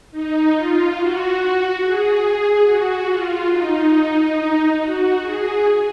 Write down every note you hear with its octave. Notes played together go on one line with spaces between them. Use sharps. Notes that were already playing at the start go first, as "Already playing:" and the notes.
D#4
F4
F#4
G#4
F#4
F4
D#4
F#4
G#4